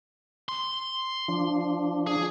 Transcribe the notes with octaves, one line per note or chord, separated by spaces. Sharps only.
C6
F3 D4
G#4